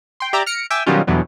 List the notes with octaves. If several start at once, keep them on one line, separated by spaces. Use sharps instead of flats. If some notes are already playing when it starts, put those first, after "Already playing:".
G5 C6
G4 D5 E5 A#5 D6
F6 A#6 C#7 D7
E5 G5 G#5 D6
B2 D#3 F#3 G3 C#4 F4
E2 G2 B2 D3 E3 F#3